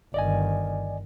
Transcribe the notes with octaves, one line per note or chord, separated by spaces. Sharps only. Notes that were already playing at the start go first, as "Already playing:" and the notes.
G1 D#3 D5 D#5 G#5